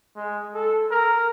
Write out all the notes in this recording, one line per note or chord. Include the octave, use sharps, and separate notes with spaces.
G#3
A4
A#4